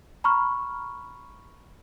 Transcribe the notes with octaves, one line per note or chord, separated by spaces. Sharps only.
A#5 B5 C#6 F6